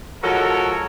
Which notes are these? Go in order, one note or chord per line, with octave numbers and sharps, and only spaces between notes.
F3 G#3 F#4 A4 A#4 C#5